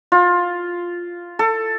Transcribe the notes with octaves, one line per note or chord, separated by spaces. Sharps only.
F4
A4